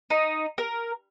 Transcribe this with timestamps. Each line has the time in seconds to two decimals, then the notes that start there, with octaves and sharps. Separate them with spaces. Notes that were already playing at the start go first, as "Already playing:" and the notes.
0.10 D#4
0.58 A#4